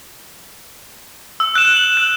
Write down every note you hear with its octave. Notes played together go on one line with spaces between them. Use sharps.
E6
F#6 E7
F#7
F#6